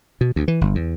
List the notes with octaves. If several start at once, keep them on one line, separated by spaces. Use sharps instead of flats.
B2
D2
E3
G1
E2